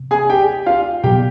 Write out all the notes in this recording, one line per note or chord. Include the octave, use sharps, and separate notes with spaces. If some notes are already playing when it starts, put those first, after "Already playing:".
Already playing: C3
G#4 G#5
G4 G5
F4 F5
B2 F#3 B3 G4 G5